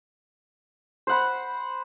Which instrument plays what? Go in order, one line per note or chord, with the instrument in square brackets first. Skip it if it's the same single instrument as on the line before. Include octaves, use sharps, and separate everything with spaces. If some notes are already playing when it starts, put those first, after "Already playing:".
[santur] C5 F#5 B5